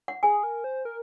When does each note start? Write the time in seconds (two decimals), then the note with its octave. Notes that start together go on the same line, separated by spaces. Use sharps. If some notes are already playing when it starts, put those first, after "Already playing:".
0.08 F#5
0.23 G#4 G#5
0.43 A#4
0.64 C5
0.85 A#4